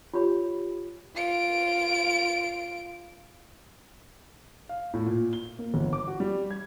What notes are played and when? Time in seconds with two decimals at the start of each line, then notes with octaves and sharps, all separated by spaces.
0.14 F4 G4 C#5 B5 C6
1.16 F4 D7
4.69 F5
4.94 A2
5.06 A#2
5.33 G7
5.59 A#3
5.74 G1
5.93 D6
6.07 F#4
6.20 G3
6.51 G#6